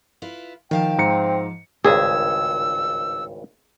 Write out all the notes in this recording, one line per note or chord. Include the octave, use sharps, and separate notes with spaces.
E4 F4 B4
D#3 F3 F5 G5 A5
G#2 C4 A#5 C#7
G#1 C#2 G2 G#4 E6